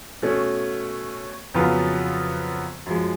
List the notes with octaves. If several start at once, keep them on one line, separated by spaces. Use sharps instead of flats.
B2 A3 C#4
F2 C#3 F#3 B3 F4
F#2 F3 G#3